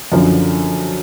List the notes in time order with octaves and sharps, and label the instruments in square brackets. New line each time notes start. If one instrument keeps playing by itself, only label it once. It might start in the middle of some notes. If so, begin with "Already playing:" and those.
[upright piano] F#2 D3 F3